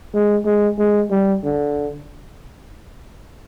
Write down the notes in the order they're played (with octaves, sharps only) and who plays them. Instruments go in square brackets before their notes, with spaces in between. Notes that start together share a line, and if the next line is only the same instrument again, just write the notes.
[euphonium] G#3
G#3
G#3
G3
D3